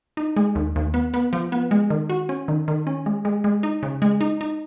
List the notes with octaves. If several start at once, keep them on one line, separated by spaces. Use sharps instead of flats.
D#4
G#3
D#2
D#2
B3
B3
F3
B3
G#3
D#3
F#4
C#4
D#3
D#3
C#4
G#3
G#3
G#3
D#4
C#3
G#3
D#4
D#4